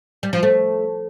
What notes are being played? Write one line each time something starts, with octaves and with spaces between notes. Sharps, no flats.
G3
F3
A3